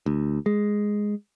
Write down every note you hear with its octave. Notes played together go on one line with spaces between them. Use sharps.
D2
G#3